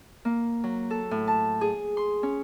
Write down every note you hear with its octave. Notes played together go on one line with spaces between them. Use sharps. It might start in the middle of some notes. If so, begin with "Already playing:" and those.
A#3
F#3
A4
A2
A5
G#4
C6
C#4